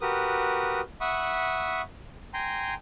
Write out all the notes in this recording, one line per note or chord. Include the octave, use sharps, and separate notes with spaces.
F#4 G4 A#4 B4 D#6
E5 F#5 B5 C#6 D#6
G5 G#5 A#5 C6